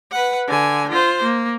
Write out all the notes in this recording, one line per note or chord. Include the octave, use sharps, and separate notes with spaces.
B4 F#5
D3 G#5
F4 C5
A#3